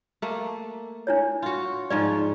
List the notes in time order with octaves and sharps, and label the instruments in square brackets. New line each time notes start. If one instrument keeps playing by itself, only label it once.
[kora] A3 A#3
[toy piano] D4 E4 C#5
[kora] F4 F#4
[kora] G#2 F3 C#4 [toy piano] D5